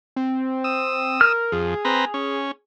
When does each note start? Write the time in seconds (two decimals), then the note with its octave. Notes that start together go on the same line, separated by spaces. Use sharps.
0.16 C4
0.64 D#6 E6
1.21 A#4 F6
1.52 F2 G#4
1.85 C4 B4 A#5
2.14 C#4